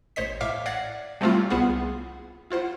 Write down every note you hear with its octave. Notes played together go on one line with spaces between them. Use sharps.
A1 C5 C#5 D#5 B6
A2 E5 F5 D6 F6
D5 F#5 G#6 A#6 C7
G3 A3 A#3 C4 E4 F4
C2 B3 F4 G#4 F#5
E4 F4 C5 F#5